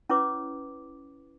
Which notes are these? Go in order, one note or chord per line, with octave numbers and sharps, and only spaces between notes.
C#4 E4 B4 C#5 D6